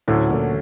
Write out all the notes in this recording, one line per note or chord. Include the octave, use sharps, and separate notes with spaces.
D2 A2 D3 F#3 A3 C#4
A#2